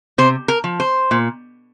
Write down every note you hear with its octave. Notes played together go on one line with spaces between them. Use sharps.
C3 C5
A#4
F3
C5
A#2